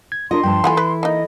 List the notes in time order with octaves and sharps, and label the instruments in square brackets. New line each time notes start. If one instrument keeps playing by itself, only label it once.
[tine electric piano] G#6
[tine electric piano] D4 F4 [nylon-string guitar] A#4 D#5 [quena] C6
[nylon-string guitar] G2 F3 A5 [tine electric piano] G5
[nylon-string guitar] E3 E4 A4 [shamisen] F4 F#5 G#5 [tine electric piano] B5
[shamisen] B4
[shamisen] A#3 D#4 [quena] D#5